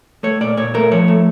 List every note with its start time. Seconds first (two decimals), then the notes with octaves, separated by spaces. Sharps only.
0.23 A3 C#5
0.41 A#2 D5
0.57 A#2 C#5
0.74 A3 A#4
0.91 F3 C#5
1.08 A3